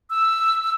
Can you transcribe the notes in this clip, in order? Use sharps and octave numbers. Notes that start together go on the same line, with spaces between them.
E6